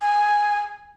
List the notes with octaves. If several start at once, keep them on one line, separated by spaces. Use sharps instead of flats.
G#5